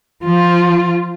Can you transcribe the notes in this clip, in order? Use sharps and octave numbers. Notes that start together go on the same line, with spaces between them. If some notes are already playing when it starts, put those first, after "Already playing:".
F3 F4